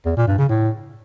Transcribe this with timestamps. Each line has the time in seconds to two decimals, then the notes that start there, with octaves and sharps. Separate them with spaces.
0.05 E2
0.16 A#2
0.27 G2
0.38 C#3
0.49 A2